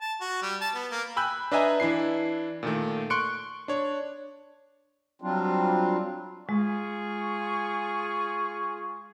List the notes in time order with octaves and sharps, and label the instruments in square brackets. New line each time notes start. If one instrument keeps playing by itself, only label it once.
[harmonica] A5
F#4
G3
A5
B3
A#3
[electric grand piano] G5 G#5 B5 E6 F#6 G6
D4 B4 D#5 E5 G#5 A#5
E3 D4 E4 C7
A#2 D#3 A3
C6 C#6 F#6 C#7 D7
D4 C#5
[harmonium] F#3 G3 C4 D4 F4
[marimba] G#3 [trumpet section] F4 G#4 C#6